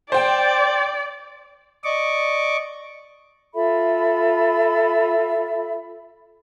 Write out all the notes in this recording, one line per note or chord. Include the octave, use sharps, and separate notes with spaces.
C5 D5 G5
D5 D#5 C#6 D6
F4 A4 E5 B5